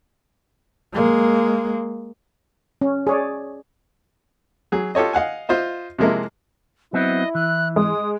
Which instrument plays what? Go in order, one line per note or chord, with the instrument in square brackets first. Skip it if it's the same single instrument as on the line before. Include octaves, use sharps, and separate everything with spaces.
[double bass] G#3 A#3
[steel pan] C#4
G#4 C#5 D5
[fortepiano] F#3 G#4
F4 G4 A4 C#5 D#5
D#5 F5 F#5 G#5
F4 C5 D#5 E5
C3 F3 G#3 A#3 E4
[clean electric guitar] F#3 B3 C4 [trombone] E4 [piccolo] D#5
[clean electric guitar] E3 [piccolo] F#6
[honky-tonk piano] G#3 [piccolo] D#6